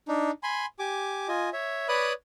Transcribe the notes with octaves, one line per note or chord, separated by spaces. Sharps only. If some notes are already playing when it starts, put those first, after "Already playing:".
D4 D#4
G#5 B5 C6
G4 G#5 D6
F4 D#5 G#5
C#5 E5
B4 C#5 D5 B5 D#6 F#6